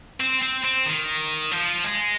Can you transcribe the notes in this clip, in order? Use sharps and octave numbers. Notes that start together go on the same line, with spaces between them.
C4
C4
C4
D#3
F3
G#3